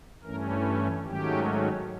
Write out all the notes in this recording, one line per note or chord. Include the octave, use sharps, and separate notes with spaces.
G2 E3 A3 C#4 A#4
A4
G#2 D#3 F#3 A3 C#4 G4